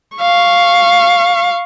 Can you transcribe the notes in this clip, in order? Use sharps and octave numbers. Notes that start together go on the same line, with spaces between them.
F5 C#6